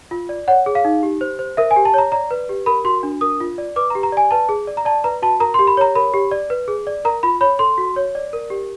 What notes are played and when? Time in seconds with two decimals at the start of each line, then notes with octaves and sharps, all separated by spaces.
0.11 F4
0.29 D5
0.48 C#5 F#5
0.66 G#4
0.75 F5
0.85 D#4
1.03 G4
1.21 C5
1.39 C5
1.57 A#4 E5
1.71 G#5
1.76 G4
1.85 A5
1.94 C#5 A#5
2.12 D5 A#5
2.31 B4
2.49 G4
2.66 A#4 B5
2.85 F#4 C6
3.03 D4
3.21 A#4 D#6
3.40 F4
3.58 D5
3.76 B4 D6
3.90 A#5
3.95 G4
4.03 A#5
4.12 D5 G#5
4.31 B4 A5
4.49 G#4
4.67 D5
4.77 A#5
4.85 D5 A5
5.04 B4 A#5
5.22 F#4 A5
5.40 A#4 A#5
5.54 C6
5.59 G4
5.67 B5
5.77 C#5 A#5
5.95 A#4 B5
6.14 G4
6.31 D5
6.50 B4
6.68 G#4
6.87 D5
7.05 A#4 A#5
7.23 F4 B5
7.41 C#5 B5
7.59 A4 C6
7.78 F#4
7.96 C#5
8.15 D5
8.33 A#4
8.50 G4